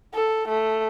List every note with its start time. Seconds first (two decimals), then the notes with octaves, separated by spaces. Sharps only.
0.14 A4
0.48 A3